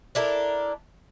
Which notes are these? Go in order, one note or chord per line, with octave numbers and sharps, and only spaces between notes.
D4 E4 A4 A#4